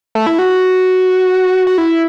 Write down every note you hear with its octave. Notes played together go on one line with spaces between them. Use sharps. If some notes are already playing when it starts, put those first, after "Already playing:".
A3
E4
F#4
F#4
E4